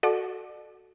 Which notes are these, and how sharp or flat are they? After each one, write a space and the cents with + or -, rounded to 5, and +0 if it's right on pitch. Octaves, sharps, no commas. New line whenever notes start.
F#4 +0 A4 +0 D5 +45